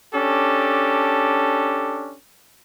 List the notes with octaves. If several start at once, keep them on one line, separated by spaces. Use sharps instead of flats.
C#4 D4 G4 A4